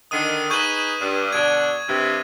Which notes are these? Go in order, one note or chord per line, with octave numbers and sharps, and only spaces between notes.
D3 D#3 D#6 D#7
D#4 G#4 B4 C#6 G6 D#7
G2
B2 D3 D4 G#6 D#7
G2 C3